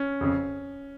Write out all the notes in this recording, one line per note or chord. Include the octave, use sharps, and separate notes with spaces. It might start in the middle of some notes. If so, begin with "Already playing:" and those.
Already playing: C#4
F2 C#3